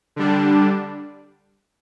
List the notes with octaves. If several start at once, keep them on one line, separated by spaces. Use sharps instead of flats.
D3 G3 D4